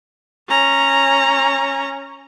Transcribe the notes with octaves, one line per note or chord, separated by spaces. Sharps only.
C#4 A#5